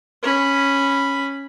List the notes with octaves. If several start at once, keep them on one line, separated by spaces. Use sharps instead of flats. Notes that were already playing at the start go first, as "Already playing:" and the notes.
C#4 B5